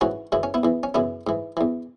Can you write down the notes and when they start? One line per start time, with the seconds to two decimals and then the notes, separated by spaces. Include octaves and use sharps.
0.01 G#2 E3 C#4 F#4
0.32 F#2 C#3 E3 E4
0.43 C#4
0.54 B3 E4
0.63 E2 E3
0.83 C#4
0.94 F#2 C#3 E3 B3 E4
1.27 G#2 E3
1.57 E2 E3